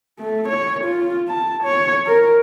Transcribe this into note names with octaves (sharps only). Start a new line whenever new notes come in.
A3
C#5
F4
A5
C#5
A#4